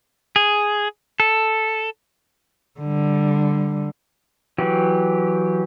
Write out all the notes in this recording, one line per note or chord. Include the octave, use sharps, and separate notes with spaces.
G#4
A4
D3 G3
E3 F#3 G4